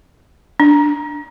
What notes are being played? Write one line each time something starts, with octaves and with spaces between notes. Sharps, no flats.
D4